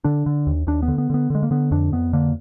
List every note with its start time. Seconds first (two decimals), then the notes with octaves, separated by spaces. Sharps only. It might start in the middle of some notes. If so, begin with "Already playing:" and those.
0.04 D3 D4
0.26 D3
0.47 D#2
0.67 D#2 D4
0.82 B3
0.88 D3
0.98 B3
1.10 D3 B3
1.30 D3 G#3
1.43 A#3
1.51 D3 B3
1.71 F2 D4
1.92 F2 B3
2.13 D3 A#3